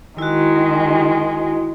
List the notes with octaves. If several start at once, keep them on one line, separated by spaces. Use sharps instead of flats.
D#3 G#3 E4 F#4